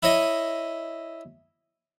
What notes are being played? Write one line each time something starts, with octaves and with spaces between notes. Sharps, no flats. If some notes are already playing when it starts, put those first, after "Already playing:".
E4 C#5 D#5